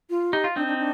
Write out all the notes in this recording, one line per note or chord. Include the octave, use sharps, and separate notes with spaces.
F4
D#4 G4
F4
C4 D4 D#4
D4
D4